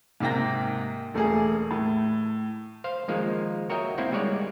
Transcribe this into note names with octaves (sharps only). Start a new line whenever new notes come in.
G#2 C3 A#3 G5 A#6
E1 A3 A#3 G#4
A2
C5 F5
D#3 F3 G#3 A#3
F#4 A#4 C#5 D#5 E5 G5
A#3 C4 E4 C5 F#5
G3 G#3 C#5 D5